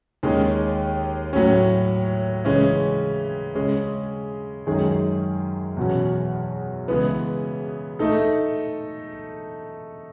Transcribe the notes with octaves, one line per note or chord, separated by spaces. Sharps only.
D#2 D#3 G#3 C#4
A2 F#3 C#4
C#3 E3 G#3 C#4
C#3 G#3 C#4 G#4
F#2 D#3 G#3 C#4 G#4
E2 B2 F#3 C#4
C#3 E3 G#3 B3
A3 D#4 A4